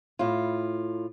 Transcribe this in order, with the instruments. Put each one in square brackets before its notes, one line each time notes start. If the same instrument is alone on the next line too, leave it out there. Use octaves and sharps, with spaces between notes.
[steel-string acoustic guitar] A2 F4